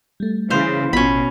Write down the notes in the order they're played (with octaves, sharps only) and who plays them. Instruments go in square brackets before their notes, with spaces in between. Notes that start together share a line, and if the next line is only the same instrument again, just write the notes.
[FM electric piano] G3 A3
[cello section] C#3 E3 [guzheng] C5 F5
[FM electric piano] A1 F4 [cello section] B2 [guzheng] C#4 B5